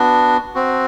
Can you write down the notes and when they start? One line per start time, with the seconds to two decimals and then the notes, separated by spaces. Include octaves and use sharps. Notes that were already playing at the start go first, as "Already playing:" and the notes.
Already playing: B3 D4 F#4
0.55 C4 F#4